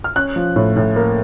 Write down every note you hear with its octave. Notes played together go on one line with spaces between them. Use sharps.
F6
C#4 F#6
F3
A2
A2
A#3